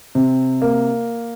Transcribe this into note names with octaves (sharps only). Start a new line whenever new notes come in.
C3
A#3